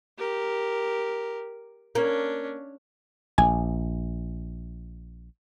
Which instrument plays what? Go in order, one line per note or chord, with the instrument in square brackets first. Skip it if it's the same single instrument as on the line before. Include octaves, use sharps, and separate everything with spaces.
[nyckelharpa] G4 A#4
[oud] A#3 [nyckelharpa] C#4 D4
[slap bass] A#1 [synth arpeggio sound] G#5